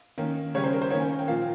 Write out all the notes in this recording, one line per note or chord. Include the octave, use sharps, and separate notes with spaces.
D#3 A#3 C#4
C#3 G3 C#4 C#5
C5
A#4
C5
D#3 A#3 C#4 C#5
G#5
G5
A#2 F3 A#3 F5